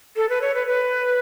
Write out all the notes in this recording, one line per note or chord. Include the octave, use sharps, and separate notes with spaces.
A4
B4
C#5
B4
B4